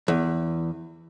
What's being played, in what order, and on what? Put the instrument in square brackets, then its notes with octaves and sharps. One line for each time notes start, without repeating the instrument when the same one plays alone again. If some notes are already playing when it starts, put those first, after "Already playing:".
[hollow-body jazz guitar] E2